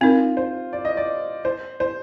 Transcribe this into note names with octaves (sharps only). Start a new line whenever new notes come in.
C4 D#4 F4 A#4
C5
D5
D#5
D5
C5
C5